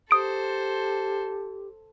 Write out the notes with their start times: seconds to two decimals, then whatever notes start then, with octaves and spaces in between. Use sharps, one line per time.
0.11 G4 A4 C5 D#6 D7